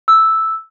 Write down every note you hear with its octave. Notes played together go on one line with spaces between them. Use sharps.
E6